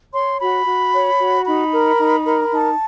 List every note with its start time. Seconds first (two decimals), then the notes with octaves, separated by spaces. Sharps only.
0.13 C#5 C6
0.40 F#4 B5
0.66 F#4
0.93 C#5
1.19 F#4
1.46 D#4 B5
1.72 A#4
1.99 D#4
2.26 A#4
2.52 D#4 A5